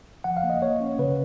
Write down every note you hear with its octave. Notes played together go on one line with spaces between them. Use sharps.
F3 F#5
F5
A#3
D#5
A#3 C#5
C#4
C#3 B4